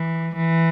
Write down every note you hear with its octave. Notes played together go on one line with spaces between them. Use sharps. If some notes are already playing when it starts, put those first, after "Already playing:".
Already playing: E3
E3